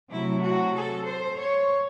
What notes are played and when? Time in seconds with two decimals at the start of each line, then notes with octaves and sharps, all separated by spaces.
0.10 C3 F#3 A3 E4
0.42 F#4
0.75 A4
1.06 C5
1.38 C#5